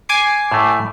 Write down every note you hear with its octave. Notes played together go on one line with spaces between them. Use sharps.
G#5 D6 C7
A2 A3